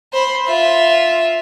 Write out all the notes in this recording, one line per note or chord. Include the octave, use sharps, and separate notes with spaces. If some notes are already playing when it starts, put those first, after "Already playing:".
C5 B5
F4 E5